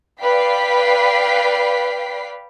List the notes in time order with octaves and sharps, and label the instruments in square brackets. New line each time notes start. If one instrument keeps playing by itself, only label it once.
[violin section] B4 D5 F5 G5 B6 C7